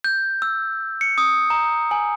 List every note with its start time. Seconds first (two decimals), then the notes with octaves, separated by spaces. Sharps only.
0.04 G6
0.42 E6
1.01 C#7
1.18 D#6
1.50 A#5
1.91 G#5